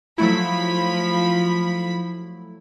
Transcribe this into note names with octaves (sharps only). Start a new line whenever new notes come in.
F3 F#3 A3 E4 B5